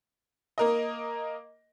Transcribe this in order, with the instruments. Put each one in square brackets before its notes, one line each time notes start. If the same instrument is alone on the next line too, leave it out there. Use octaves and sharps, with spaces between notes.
[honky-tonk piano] A#3 A#4 D#5